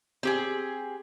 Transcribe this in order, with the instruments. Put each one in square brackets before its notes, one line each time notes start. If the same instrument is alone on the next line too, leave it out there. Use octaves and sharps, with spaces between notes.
[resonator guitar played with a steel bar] C4 G4 G#4